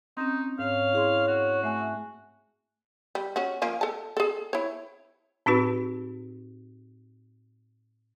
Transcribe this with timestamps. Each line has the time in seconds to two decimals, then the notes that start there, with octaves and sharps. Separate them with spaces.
0.17 C4 C#4 D#4
0.59 G#2 C#5 F5
0.93 E4 G#4 C6
1.27 F#4
1.63 A3 E5 G#5 F#6
3.15 G3
3.36 C#4 F#4
3.62 F3 A#3 C#4
3.81 A4 A5
4.17 G#4 A4
4.53 E4 C#5
5.46 A2 C4 D#4 F#4 B4